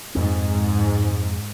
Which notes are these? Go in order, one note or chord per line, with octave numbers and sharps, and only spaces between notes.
F2 G#2 C4